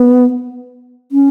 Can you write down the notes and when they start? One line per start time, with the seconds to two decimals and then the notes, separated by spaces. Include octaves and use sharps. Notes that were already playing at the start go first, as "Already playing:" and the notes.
Already playing: B3
1.12 C#4